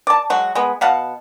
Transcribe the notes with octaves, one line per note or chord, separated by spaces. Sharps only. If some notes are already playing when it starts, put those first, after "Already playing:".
D5 A5
F#3 G#3 F#4
G#3 B3
B2 F5 F#5 A5